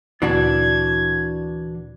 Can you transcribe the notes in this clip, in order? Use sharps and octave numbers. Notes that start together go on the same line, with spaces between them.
D2 A#2 E3 D4 F#4 G#6